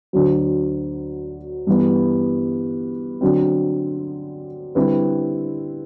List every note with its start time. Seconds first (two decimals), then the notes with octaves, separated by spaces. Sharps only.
0.13 D2 D3 F#3
1.67 G2 E3 B3
3.21 D3 F#3 C4
4.75 D3 G3 C4 E4 B4